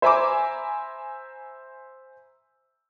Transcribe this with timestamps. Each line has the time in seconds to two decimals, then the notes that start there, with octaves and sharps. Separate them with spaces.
0.02 C5 E5 G#5 A#5 B5 D6